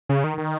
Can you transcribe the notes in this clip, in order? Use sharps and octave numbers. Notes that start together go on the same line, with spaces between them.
C#3
D#3
D#3